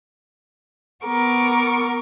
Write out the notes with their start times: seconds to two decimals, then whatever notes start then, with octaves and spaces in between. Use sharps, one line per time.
1.04 B3 A#4 C#6 D6